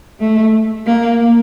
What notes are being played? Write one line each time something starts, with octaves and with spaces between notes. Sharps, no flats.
A3
A#3